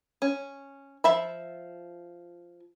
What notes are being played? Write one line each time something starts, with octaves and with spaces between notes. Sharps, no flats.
C#4
F3 E5 B5